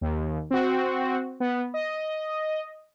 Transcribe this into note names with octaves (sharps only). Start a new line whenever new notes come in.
D#2
C4 F#4
B3
D#5